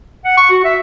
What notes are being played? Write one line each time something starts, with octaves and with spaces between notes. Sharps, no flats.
F#5
C#6
F#4
E5